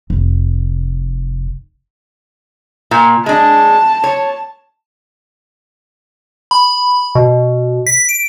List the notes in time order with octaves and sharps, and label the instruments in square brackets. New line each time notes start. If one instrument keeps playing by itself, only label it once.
[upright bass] F1
[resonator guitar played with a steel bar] A#2
[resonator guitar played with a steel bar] G#3 D4 [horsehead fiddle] A5
[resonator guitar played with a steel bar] C#5
[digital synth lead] B5
B2
B6
D7